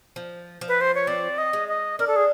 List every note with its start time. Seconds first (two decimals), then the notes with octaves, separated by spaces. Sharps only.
0.16 F3
0.61 F3
0.68 B4
0.81 C5
0.95 C#5
1.07 C4 D5
1.38 D#5
1.53 G#3
1.68 D#5
1.99 D4 A#4
2.07 A4
2.16 G#4